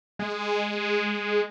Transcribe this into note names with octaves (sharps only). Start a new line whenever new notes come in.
G#3